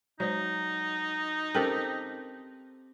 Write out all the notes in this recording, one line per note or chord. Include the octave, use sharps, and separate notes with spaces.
F#3 G#3 D#4 C5 D5
C4 C#4 G4 A4 A#4 G5